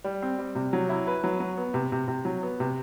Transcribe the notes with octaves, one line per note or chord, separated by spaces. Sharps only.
G3
C4
G3
C3
F#3
E4
B4
F#3
F#3
B3
C3
C3
C3
F#3
B3
C3